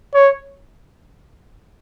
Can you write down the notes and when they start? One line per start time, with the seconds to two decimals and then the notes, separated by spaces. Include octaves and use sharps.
0.14 C#5